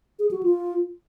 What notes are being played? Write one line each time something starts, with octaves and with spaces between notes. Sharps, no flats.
G#4
F#4
F4